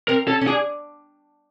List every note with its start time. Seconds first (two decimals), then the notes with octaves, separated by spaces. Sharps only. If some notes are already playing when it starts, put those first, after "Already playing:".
0.08 C4 A#4
0.27 C#4 A4
0.41 C#4
0.47 D4 G#4